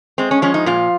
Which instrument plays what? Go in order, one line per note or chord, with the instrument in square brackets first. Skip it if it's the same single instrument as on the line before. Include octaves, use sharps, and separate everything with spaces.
[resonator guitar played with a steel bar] G#3 C4
C#4
F3 C#4
D#4
A#2 F4